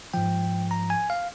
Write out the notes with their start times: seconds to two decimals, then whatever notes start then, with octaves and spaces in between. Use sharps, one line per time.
0.14 G#2 F3 G5
0.71 A#5
0.90 G#5
1.10 F5